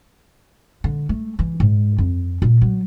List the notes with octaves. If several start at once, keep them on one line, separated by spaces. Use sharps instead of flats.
D3
A3
E3
G#2
F2
A#2
F#3